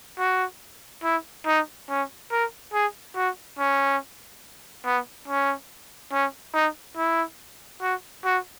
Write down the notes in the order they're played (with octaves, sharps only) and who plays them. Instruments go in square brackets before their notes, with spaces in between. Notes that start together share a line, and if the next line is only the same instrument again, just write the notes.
[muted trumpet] F#4
E4
D#4
C#4
A#4
G#4
F#4
C#4
B3
C#4
C#4
D#4
E4
F#4
F#4